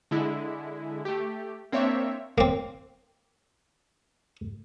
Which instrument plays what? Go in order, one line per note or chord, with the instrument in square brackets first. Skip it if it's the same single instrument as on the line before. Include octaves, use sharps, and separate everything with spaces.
[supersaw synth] D3 G#3 E4
A3 G4
A#3 C4 D4 C#5 E5
[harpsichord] A#3 C4